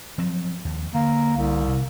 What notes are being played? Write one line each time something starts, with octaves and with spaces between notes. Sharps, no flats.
F3 F#3 C4
D#2
D3 A#3
C2
C3